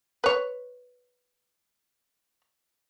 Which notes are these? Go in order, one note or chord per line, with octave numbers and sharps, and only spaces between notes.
B4 C#5